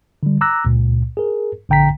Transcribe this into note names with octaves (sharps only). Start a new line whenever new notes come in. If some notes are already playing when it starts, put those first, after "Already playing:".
D3 G3
A#5 D6 E6 F#6 A#6
C#2 A#2
G#4 A#4
A#1 D3 G5 A#5 B6